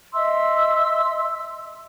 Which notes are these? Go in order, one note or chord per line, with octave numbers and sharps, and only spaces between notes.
D#5 E5 C6 E6